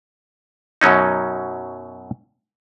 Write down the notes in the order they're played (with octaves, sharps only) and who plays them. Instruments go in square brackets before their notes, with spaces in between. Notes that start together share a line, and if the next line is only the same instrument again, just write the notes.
[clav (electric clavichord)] F#2 B2 F#3 C#4 D#4